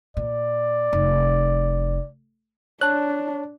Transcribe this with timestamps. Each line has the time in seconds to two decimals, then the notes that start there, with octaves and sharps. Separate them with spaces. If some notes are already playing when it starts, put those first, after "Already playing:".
0.17 A#2 D5
0.93 F1
2.81 D4 C#5 A5 F#6